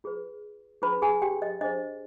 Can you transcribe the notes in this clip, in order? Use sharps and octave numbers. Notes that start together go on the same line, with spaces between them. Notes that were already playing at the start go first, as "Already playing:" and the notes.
F4 G#4 B4
D4 F4 G#4 B4 B5
G#4 G#5
G4 G5
D#5
D4 G#4 C5 D#5